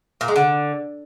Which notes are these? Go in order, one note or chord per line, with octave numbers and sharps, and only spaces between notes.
A#2
G#3
D3